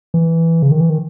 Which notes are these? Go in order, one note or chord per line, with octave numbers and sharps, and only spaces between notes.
E3
C#3
D#3
E3
D#3